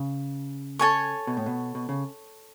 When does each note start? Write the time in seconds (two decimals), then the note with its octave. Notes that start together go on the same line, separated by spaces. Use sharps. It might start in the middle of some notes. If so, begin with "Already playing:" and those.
Already playing: C#3
0.79 A4 C#5 G#5 C#6
1.27 B2
1.37 A2
1.46 B2
1.75 B2
1.89 C#3